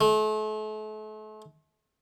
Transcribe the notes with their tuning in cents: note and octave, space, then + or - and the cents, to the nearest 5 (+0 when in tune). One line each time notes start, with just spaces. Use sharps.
A3 -40